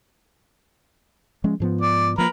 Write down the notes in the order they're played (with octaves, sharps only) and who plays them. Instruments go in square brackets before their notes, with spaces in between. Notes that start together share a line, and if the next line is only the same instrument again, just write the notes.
[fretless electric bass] F3 G#3 C#4
G#2 F3 B3
[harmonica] D5
[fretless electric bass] F3 A#3 [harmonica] A#4 B4